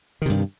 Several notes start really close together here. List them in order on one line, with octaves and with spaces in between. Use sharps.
D#3 C3 G2